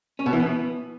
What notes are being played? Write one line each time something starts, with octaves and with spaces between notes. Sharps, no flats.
C#4
B2
E3
B3